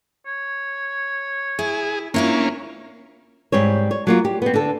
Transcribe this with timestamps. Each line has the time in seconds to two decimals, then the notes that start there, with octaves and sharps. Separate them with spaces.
0.26 C#5
1.59 E4 G#4
2.14 A#3 C#4 D4 E4 F4
3.52 G#2 G3 C4 C#5
3.91 C#5
4.07 F#3 A#3 F4
4.25 G4
4.42 B3 C4
4.54 D3 A4